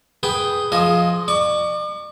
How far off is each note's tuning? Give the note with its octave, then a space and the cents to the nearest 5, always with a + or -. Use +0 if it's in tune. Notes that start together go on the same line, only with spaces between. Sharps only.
G#4 +0 B4 +0 G5 +0
F3 +0 G#4 +15 D#5 +0
D5 +45 C#6 +40